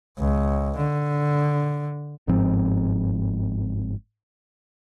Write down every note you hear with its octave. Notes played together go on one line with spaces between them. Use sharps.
C#2
D3
G1 G#2 F3 C4